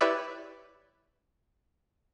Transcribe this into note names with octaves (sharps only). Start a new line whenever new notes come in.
E4 G4 B4 C#5 D5 E5